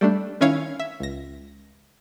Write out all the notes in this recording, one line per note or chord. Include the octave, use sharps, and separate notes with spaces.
G3 A3 D4
D#3 C#4 E4 C#5 F5 G#6
E5
C#2 A#6